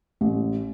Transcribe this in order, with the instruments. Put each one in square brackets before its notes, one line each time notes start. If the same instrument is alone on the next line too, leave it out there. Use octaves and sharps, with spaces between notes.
[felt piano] A1